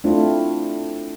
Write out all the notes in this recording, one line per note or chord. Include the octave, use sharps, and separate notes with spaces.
A3 C4 D4 E4 F4